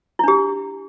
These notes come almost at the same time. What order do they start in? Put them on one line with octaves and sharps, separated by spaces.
E4 D4 G4